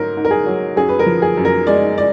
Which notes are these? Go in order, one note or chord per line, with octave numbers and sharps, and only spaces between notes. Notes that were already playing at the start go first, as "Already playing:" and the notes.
Already playing: G#2 F#3 A#4
G#2
A#4
G#4
F#3
F#2 G#4
B4
A#4
F3
G#4
F#2
A#4
G#3 D5
D5